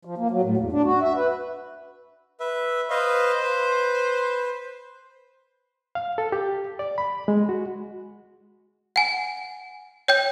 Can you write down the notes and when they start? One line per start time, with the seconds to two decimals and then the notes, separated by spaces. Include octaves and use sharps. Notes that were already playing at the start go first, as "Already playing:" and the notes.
0.05 F3
0.18 A#3
0.31 F#3
0.42 A2
0.57 E2
0.72 D4
0.85 F#4
1.02 E5
1.16 B4
2.40 B4 E5
2.90 B4 C5 D#5 F5
3.43 B4
5.95 F5
6.18 A4
6.32 G4
6.79 D5
6.98 B5
7.28 G#3
7.49 F#4
8.96 F#5 G#5
10.08 C#5 G5 G6